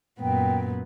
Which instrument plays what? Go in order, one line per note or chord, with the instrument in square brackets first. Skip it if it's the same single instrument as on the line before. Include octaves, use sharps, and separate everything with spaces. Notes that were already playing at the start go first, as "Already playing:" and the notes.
[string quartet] F#2 A#2 B3 [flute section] G5